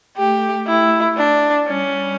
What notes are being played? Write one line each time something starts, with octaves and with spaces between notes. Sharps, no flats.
A3 G4
A3 E4
D4
G3 C#4